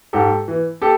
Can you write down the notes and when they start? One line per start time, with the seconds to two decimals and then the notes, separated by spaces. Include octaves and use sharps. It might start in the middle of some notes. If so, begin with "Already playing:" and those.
0.13 G#2 G4 A4
0.48 E3
0.82 G4 A4